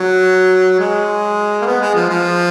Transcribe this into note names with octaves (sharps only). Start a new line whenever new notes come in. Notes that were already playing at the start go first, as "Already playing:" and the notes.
Already playing: F#3
G#3
A#3
B3
G#3
F3
F3